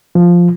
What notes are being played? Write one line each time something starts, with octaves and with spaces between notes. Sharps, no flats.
F3